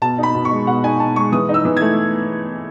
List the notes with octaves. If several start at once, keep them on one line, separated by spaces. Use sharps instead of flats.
B2 A5
D#4
B5
B2
C#6
G#3
B2 F#5
D#4 G#5
B2 A5
G#3 C#6
E3 D#6
D#4
E6
E3
G#6
A3